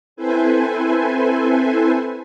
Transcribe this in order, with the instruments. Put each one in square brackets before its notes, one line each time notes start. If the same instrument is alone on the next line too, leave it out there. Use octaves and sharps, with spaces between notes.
[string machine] C4 E4 A4 B4 C5 G#5